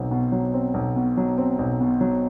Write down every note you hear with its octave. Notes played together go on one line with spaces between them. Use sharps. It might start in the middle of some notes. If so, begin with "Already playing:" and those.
Already playing: B1 F#3 C4
B2
F#3
C4
B1
B2
F#3
C4
B1
B2
F#3